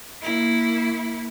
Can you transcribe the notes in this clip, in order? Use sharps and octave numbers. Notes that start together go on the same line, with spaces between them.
A#3 E4